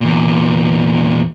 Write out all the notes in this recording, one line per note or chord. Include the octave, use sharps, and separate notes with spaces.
E2 A#2